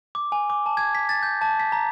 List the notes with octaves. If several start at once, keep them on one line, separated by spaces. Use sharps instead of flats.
D6
G#5
D6
A5
G#6
B6
A6
G6
A5
B6
A#5